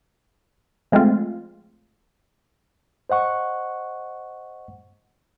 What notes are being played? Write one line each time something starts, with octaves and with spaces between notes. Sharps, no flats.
F3 G#3 A3 C4 F4
C5 D#5 F#5 C#6